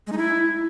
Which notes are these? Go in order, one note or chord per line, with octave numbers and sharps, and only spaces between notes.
G#3
D#4
E4